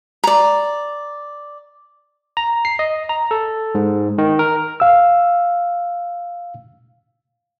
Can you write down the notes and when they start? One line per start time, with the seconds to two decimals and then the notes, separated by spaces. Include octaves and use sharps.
0.24 D5 A#5
2.37 A#5
2.65 C7
2.79 D#5
3.09 A#5
3.31 A4
3.75 G#2
4.18 D#3
4.39 A#4
4.80 F5 E6